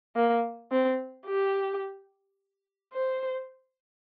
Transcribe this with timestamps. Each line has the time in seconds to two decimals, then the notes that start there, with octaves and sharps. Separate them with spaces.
0.16 A#3
0.71 C4
1.27 G4
2.93 C5